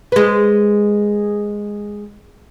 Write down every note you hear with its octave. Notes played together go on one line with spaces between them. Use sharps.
G#3 B4